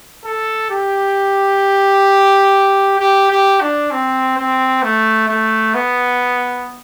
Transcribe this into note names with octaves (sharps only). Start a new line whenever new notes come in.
A4
G4
G4
G4
D4
C4
C4
A3
A3
B3